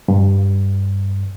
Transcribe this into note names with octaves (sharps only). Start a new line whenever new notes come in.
G2